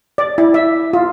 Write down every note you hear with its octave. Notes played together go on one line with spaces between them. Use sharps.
D5
E4
E5
F4